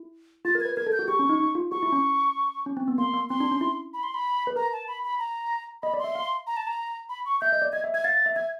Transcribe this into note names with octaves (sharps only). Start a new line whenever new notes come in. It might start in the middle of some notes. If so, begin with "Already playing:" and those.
Already playing: E4
F4 A6
A#4
B4 G#6
A#4 G#6
A4
G6
F#4
G4 C#6
C#4
D#4
D#4
F4
F#4 C#6
E4
C#4
C#4
C4
B3
A#3 C6
A#3
C4 C6
D4
C#4
E4
B5
C6
B5
B4
A#4 A#5
A5
B5
B5
A#5
D#5 B5
D5
C6
E5
F5
A#5
A5
A#5
B5
C#6
E5 G6
D#5
D5
D#5 G#6
E5
E5 G#6
F5 A6
E5
E5 G#6